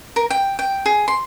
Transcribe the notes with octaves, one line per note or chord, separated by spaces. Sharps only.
A#4
G5
G5
G#4
C6